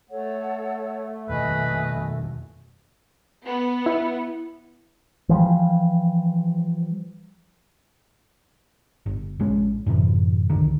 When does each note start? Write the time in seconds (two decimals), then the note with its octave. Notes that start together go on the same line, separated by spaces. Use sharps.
0.10 A3 A4 C#5 F#5
1.29 F2 B2 D#3 B4 D#5 G#5 D#6
3.46 B3
3.86 E4
5.29 E3 F3 G3
9.06 G1
9.40 A#1 G#3 C#4
9.86 F#2 A2 C3 E3
10.50 C2 G2 D3 D#3